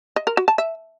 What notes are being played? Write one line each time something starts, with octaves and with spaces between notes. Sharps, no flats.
D#5
A#4
F#4
A5
E5